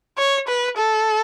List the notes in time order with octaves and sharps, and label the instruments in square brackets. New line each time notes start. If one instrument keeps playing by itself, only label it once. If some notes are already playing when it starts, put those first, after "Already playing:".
[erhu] C#5
B4
A4